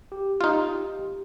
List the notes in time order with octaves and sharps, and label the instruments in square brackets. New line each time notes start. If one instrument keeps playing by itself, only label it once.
[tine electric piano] G4
[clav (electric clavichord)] D#4 F4